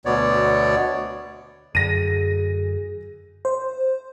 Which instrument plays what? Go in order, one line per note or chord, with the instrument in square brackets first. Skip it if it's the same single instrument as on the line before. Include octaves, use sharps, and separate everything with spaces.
[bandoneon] D2 B2 B3 C#5 D5
[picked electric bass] F#2 D3 [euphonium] G#4 [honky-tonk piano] A#6 D#7
[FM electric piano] C5